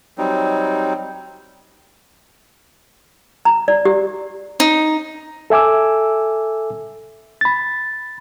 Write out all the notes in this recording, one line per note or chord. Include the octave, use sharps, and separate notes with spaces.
F#3 G3 C4 D#4
A#5
D5
G4
D#4
A4 E5 G#5 D6 E6
B5 A6